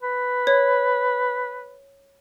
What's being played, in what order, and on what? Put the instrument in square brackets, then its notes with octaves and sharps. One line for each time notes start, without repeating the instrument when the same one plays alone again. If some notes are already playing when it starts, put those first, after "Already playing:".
[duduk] B4
[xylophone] C#5